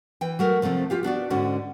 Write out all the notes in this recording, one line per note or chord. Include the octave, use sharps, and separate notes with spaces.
E3 G5
F#3 A3 A#4
C3 F3 A3 C4
F4 G4 F5
B3 D4 F#4 D5
G#2 D3 C#4 F#4